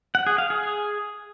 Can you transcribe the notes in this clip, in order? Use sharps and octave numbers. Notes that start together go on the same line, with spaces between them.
F#5
G#4
F5
G#4